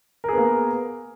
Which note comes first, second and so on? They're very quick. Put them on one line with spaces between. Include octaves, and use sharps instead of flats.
A#4 G#4 B3 A#3